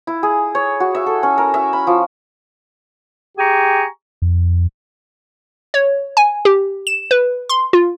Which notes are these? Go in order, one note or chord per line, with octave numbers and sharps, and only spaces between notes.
E4
G#4
C#5
F#4
E5
A4
C#4
A#4
E5
B5
F3
G4 G#4 G5 G#5 A#5 C#6
F2
C#5
G#5
G4
E7
B4
C6
F4